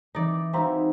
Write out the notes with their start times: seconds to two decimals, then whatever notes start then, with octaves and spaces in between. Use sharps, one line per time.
0.15 E3 C4 D#4 D5
0.53 G#3 C4 D#4 E4 F#4 F5 A#5 C6